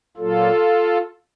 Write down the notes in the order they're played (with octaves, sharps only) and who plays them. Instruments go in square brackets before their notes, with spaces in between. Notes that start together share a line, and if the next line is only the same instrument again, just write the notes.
[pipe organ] A#2 F#3 A#3 F4 A4